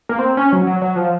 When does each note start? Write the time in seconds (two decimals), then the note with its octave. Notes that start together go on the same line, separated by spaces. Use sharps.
0.09 A#3
0.19 C4
0.37 C#4
0.52 F#3
0.67 F#3
0.82 F#3
0.96 F3